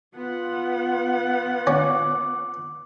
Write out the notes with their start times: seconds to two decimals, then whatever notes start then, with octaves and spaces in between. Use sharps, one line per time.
0.15 B3 F4 F#5
1.67 C#4 D6